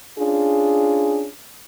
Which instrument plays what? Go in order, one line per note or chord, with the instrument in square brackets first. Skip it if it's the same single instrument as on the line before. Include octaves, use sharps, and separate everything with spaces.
[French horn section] C#4 D4 F4 G#4